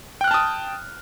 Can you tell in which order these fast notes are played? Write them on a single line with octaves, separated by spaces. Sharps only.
G5 F#6 F6 A5 D#6